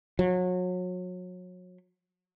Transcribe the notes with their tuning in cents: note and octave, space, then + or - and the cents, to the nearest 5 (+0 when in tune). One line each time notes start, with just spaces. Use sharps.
F#3 -30